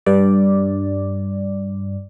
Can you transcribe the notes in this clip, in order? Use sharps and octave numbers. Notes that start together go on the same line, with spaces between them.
G2 D5